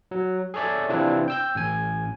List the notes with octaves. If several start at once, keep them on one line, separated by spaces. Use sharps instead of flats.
F#3
G#4 A4 C#5 D5 E5
C3 E3 C4 D4 E4 F4
G5 E6 G6
A1 G#5